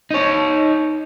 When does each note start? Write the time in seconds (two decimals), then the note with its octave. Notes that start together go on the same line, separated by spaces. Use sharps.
0.11 D#4 C#5